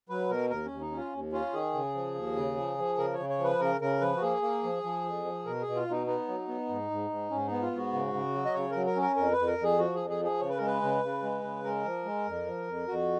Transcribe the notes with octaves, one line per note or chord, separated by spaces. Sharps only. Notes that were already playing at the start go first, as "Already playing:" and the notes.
F#3 B4
B2 A#4
D#2 A#4
C#4
D#2
D#4
C#4
F4
D#2
C#4 F4
D#3 G#4
C#3
F3
D#2
C#3
F3
F3
C#3 A#4
C#5
C#3
C#5
F3
B4
C#3 A#4
C#3 A#4
F3 B4
F#4
A#3 G#4
A#3
F3
F3
F2
F3
B2 A#4
B2 G#4
F4
B2 D#4
B3 D#4
F#3
B3
G#2
G#2
G#2
G#2 C#4
B3 D#4
F4
G#2
F#4
C#3
C#3
F#3
D#5
C#3 C#5
F#3 A#4
A#4
C#4
A#4
F2 A#4
B4
F2
A#4
F2
G#4
F3 F#4
F2 G#4
G#4
F3 G#4
C#3 C#5
B4
G#3 A#4
B4
C#3
C#3
G#3
C#3
G#3 A#4
F3
G#3
F2
F3
F2
F2 F#4